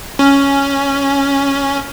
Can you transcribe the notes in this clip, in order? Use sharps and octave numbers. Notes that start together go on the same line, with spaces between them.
C#4